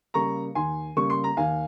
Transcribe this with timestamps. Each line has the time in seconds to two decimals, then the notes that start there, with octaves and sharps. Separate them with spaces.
0.14 C#3 G3 A#3 A#5 C#6
0.55 D#2 G#5 C6
0.96 C#3 G3 A#3 C#6
1.10 C6
1.24 A#5
1.37 D#2 F5 G#5